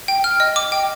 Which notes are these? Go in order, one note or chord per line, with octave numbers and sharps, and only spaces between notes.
G5
F6
D#5
D6
G5